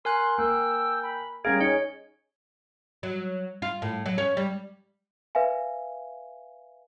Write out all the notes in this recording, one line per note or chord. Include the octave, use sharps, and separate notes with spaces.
A#4 G#5 C6 F#6
A#3 G5 E6
B5
G3 C#4 G#4 A#4 F5 G#6
D#4 C#5 G#5 C#7
F#3
F4
A2
F#3
C#4
G3
B4 E5 F5 G#5